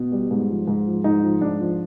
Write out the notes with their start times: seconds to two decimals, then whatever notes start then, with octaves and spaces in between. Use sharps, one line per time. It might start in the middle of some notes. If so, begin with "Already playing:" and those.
Already playing: B2
0.12 G3
0.31 G#2
0.50 F3
0.68 G#2
0.86 F3
1.04 G#2 D#4
1.23 F3
1.41 G#2 D4
1.60 F3